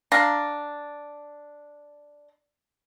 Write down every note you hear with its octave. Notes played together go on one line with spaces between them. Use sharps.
D4 F5 A#5